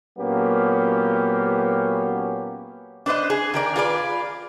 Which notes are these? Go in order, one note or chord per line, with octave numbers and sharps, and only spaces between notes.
A#2 F#3 A#3 B3 C#4 G4
D4 B4 C5 D#5
G#4
D#3 A#4 D5
F4 G#4 B4 D5